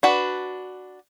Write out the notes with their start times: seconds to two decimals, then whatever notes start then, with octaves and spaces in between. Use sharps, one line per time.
0.03 D4 F#4 B4